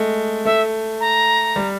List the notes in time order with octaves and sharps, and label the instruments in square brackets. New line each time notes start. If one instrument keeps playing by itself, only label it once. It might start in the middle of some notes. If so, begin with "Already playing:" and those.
Already playing: [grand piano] G#3 A3
[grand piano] A3 [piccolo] E5
[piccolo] A#5
[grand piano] G3